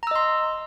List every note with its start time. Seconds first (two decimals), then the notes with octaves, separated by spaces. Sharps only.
0.03 A#5
0.07 E6
0.11 D#5
0.16 C6